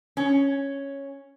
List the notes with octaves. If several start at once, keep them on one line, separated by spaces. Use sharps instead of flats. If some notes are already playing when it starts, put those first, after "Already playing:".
C#4